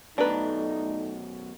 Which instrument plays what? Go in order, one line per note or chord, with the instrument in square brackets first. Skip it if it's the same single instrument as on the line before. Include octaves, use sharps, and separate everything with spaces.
[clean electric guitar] F#2 B2 A#5 [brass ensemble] A3 D#4 [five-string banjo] D4 B4